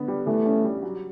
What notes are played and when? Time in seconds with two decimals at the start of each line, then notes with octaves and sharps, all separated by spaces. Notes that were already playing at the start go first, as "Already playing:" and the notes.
Already playing: D3 B3
0.08 G3
0.26 E3 A3
0.46 C#4
0.64 G3
0.83 F#3